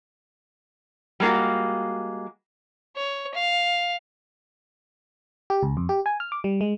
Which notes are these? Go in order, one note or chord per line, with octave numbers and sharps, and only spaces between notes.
G3 G#3 A#3 F4 F#4
C#5
F5
G4
C#2
F2
G4
G#5
F6
D6
G3
G#3